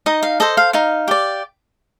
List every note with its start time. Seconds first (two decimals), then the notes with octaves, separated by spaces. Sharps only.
0.06 D#4 D#5
0.23 F5
0.40 A4 C5 D#5
0.57 F5
0.73 D#4 F5
1.08 G4 D5